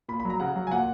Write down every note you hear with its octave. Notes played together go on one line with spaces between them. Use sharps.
A#2 B5
B5
F#3
A#5
C#3 F#5
F#3
G#5
A#2 F#5